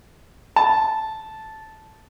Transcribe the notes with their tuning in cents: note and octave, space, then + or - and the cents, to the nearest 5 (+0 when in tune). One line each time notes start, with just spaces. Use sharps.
A5 -10